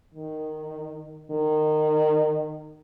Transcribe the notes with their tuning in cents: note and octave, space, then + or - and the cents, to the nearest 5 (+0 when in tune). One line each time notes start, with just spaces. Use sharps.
D#3 -10
D#3 -20